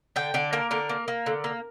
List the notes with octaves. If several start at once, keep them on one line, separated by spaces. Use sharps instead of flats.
D3 G5
D3 D5
A#3 A#4
D3 A#4
A#3
A#3
D3
A#3